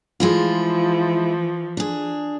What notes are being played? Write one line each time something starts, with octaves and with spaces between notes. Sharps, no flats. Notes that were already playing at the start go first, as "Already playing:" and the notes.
E3 F3 G#3 E4 F4
D4 G#4